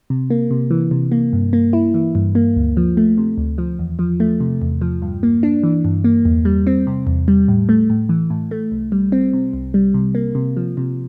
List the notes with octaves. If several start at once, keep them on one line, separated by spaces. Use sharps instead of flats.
C3
A#3
C3
E3
C3
A#3
G2
A#3
E4
E3
G2
A#3
D2
F3
A3
C3
D2
F3
E2
F3
A3
C3
E2
F3
G2
A#3
D4
E3
G2
A#3
E2
G3
C4
C3
E2
G3
A2
A3
A2
E3
A2
A3
C2
G3
C4
C3
C2
G3
C3
A#3
C3
F3
C3